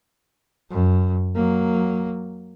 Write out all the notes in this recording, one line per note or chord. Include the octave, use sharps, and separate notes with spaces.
F#2
F#3 A#3